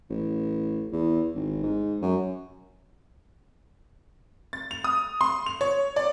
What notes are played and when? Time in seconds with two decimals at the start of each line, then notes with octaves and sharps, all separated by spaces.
0.10 A1
0.92 E2
1.35 G#1
1.63 G#2
2.02 F#2
4.53 A6
4.71 F7
4.84 D#6
5.21 C6
5.46 F7
5.61 C#5
5.96 D5